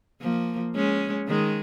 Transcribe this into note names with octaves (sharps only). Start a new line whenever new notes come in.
F3 A#3
G#3 C#4
D#3 G#3